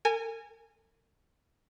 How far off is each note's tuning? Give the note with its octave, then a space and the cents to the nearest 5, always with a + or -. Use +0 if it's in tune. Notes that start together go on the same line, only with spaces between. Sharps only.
A#4 -40 G#5 -10